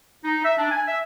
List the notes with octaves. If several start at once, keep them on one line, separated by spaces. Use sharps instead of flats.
D#4
E5
D4
G#5
E5